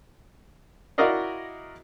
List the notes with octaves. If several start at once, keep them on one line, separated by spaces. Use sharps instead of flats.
E4 F#4 A#4 D5 D#5 F5